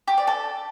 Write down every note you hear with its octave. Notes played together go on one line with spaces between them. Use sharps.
G4
D5
A4